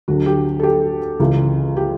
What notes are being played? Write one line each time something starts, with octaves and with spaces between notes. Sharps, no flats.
D2 D3 F#3 F#4
G4
A4
G4
C#2 C#3 E3
G4